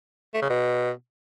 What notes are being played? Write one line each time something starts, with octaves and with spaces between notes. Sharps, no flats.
A3
C#3
B2